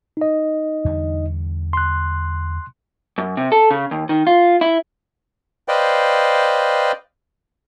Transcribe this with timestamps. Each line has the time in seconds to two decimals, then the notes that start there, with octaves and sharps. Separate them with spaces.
0.17 D#4 D#5
0.85 E2 D3 G3
1.73 C6 F#6
3.18 F#2
3.37 C3
3.52 A4
3.71 C#3
3.91 D#2
4.09 D#3
4.27 F4
4.61 E4
5.68 B4 C5 D5 D#5 F5 G5